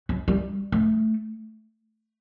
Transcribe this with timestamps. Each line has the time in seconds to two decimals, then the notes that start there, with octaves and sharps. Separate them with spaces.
0.09 F#3
0.28 G3
0.72 A3